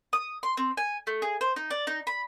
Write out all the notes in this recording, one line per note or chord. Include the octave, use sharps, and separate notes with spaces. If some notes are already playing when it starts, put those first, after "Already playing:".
D#6
C6
C4
G#5
A3
G#4
C5
D#4
D5
D#4
B5